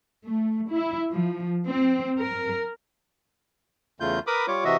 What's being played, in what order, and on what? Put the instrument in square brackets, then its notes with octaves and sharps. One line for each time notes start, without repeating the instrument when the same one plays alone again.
[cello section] A3
E4
F3
C4
A#4
[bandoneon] E2 C#3 A3 F4 G6
A#4 B4 B5 D6 D#6
G3 F4 C#5 D6
C3 E3 F#4 D#5 E5